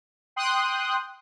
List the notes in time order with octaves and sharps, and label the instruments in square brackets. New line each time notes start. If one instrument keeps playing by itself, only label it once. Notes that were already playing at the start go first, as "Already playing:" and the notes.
[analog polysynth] G5 C6 D#6 F#6